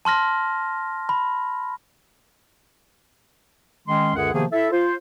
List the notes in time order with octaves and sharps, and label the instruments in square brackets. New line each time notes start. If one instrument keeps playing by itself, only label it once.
[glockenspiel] A5 C6 F6 A#6
B5
[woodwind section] D#3 G#3 C#4 C6
C#2 F#2 D3 G#4 F#5
C3 D#3 F3 A#3 B3 G#4
E4 A4 E5
F4 C5